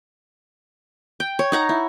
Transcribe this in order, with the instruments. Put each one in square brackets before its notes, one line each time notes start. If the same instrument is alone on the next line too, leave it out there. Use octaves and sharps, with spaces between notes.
[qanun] G5
C#5
D#4 F#5 A#5
E4